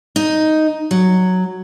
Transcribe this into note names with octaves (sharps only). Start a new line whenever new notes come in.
D#4
F#3